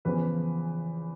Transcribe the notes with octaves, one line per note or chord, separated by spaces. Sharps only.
E2 C#3 F3 B4